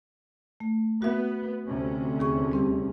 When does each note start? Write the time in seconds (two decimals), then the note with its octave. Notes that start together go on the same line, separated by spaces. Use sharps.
0.60 A3
1.02 B3 F#4 E5
1.67 D2 C3 C#4
2.19 D#2 G#4 C#6
2.52 G3 C4 G4